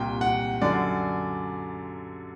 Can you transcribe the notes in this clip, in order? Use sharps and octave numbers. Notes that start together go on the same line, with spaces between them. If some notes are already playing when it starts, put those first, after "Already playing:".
Already playing: C2 A#2 G5
F#5
F#2 D3 D5